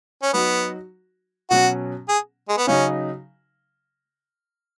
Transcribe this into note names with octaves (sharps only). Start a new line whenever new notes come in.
C#4
F#3 B3 D#4 F#4
B2 F#3 C#4 F#4
G#4
G#3
B3
C#3 F#3 C#4 D#4